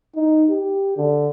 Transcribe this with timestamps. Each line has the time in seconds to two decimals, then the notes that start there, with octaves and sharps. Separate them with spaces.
0.16 D#4
0.50 G4
0.97 D3